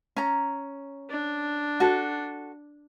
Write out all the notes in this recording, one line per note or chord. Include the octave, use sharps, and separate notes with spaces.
C#4 A#5
D4
F#4 A4